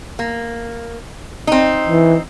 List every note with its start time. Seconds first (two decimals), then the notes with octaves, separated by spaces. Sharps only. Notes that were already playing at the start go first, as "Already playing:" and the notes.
0.19 A#3
1.47 C4 D#4
1.90 E3